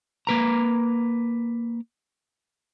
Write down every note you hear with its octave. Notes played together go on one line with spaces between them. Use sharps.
A#3 B4 A#5